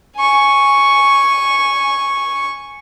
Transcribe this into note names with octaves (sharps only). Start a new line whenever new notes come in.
G#5 C#6